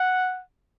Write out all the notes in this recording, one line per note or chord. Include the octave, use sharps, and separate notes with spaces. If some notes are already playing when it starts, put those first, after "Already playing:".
Already playing: F#5